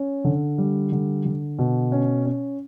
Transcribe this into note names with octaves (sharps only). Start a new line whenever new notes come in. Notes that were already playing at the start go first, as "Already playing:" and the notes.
Already playing: C#4
D3
G3
D3
D3
B2
C#4
C#4